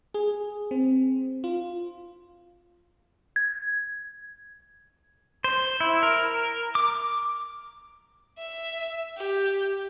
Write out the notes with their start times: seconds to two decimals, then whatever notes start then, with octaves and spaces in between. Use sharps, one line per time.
0.14 G#4
0.71 C4
1.44 F4
3.36 G#6
5.44 C5
5.80 E4
6.03 A#4
6.75 D6
8.38 E5
9.17 G4